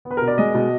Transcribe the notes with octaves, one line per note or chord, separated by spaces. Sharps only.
B3
B4
B2 A#4
D5
G#3 D#5
B2